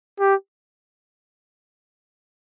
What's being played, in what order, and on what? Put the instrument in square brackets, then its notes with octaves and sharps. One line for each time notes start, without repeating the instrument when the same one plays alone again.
[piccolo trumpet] G4